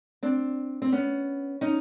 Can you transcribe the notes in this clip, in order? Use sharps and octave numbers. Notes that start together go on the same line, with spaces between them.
C4 D4
C4
B3 C#4
C#4 D#4